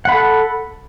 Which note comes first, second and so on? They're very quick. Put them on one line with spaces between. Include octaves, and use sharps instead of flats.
F#5 B5 A4